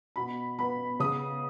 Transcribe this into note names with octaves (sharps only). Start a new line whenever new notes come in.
B2 B5
B3 B5
C#3 D#6